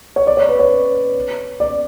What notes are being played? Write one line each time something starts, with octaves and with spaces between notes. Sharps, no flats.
C#5
D5
C#5
B4
C#5
D5